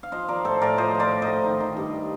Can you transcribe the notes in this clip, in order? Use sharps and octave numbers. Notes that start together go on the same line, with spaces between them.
F5
F3 C5 D#5
F3 A#4 D5
A2 A4 C5
A2 A#4 D5
F3 C5 D#5
F3
A#4 D5
A2
A2 C5 D#5
D#3
D#3
G2